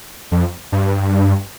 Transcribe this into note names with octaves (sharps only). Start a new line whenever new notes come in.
F2
G2